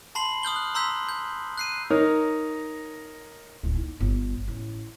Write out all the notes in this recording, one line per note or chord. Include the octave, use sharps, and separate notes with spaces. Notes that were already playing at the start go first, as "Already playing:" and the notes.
A5 B5 C6 C7 F#7
D#6 F6 G6 G7
F#6
A#5 C6 E6 G6 B6
G6
F#6 C7 D#7
D#4 A#4 C#5
D1
D#4
G1
A1